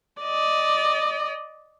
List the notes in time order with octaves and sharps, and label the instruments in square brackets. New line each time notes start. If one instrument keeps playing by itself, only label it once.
[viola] D5 D#5